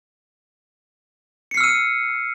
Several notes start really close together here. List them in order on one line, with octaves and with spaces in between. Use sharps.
C#7 C7 F6 E6 D#7